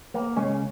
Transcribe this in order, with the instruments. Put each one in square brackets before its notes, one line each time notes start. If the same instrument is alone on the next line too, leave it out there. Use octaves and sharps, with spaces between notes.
[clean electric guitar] A#3
[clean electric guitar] C#3 [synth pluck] G#3 C#4